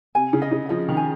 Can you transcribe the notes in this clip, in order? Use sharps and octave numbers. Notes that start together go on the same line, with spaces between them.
C3 G#5
C#3
D#5
C#3
F3 D#5
D#3
G#5